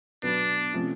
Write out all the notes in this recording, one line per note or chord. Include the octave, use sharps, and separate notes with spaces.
B2 F#3 B3 D4
C3 F3 A3 C#4